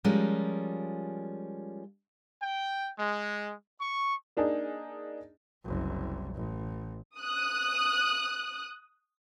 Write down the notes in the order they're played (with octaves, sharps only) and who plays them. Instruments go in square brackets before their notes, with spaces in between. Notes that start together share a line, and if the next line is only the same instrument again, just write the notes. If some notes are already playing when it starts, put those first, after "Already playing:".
[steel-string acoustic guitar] F3 G3 G#3 C#4 F4 A#4
[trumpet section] G5
G#3
C#6
[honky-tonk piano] A#3 D4 D#4 G#4
[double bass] F#1 C2
A1
[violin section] D#6 F#6